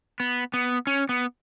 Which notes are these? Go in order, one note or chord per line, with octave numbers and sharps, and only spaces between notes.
B3
B3
C#4
B3